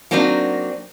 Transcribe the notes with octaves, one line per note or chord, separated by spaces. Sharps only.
F#3 A#3 C4 D4 D#4 F#4